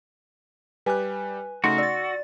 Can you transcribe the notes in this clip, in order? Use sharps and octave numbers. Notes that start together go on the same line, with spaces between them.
G3 G4 B4 G#5 F#6
C#3 A3 D#4 F#4 C6
D5 E6 A6